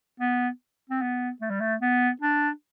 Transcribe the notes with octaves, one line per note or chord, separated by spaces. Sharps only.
B3
C4
B3
A3
G3
A3
B3
D4